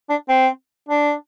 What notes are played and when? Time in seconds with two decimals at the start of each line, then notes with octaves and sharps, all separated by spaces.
0.10 D4
0.29 C4
0.89 D4